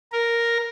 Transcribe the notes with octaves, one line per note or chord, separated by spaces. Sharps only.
A#4